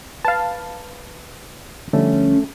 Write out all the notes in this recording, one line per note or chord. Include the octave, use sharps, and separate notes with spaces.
B4 F5 A5
D3 F3 G3 A3 C#4